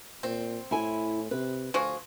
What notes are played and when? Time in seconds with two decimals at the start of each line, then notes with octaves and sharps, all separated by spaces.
0.23 A#2 C4
0.71 A2 E4 G#5
1.31 C3 B4
1.74 D2 F3 F#4 G#4